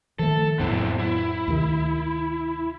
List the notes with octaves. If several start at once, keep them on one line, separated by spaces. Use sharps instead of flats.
D#3 F3 A3 A4
F2 A2 F#3 B3 C4 E4
E4
D2 C3 D#3